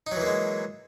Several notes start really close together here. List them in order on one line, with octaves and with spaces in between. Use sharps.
D#4 F#3 E3 A#3 G#3